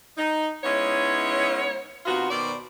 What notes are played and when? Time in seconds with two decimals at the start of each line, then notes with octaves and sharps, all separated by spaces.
0.17 D#4
0.63 G#3 B3 C#4 D#4 E4 C#5
2.06 C3 B3 D#4 F4 F#4
2.30 B2 D#3 C5 D5